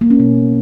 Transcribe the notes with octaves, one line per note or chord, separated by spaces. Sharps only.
A#3
C#4
B2